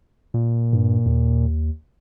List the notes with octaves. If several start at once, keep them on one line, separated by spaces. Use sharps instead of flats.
A#2
G2
D#2